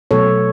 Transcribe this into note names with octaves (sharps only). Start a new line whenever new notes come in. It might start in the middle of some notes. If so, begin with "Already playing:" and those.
B2 F#3 A3 A4 C#5